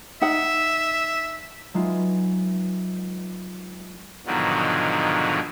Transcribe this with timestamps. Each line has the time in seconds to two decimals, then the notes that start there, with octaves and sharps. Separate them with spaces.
0.22 D#4 E5 F#5
1.74 F#3 G#3 D#4 F4 B4 E5
4.26 G#2 B2 D3 D#3 F3 F#3